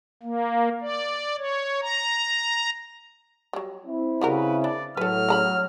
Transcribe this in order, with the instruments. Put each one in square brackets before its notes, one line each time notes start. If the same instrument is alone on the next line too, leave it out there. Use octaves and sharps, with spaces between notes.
[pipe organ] A#3
D5
C#5
A#5
[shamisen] F#3 G3
[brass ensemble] C4 E4
[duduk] C#3 [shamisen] G3 F#4 A#4 [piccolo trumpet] B4
[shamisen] D4 [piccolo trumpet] D5
[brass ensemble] A2 [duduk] F#3 [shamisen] A4 B4 [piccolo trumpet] F6
[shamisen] C#3 A#5 B5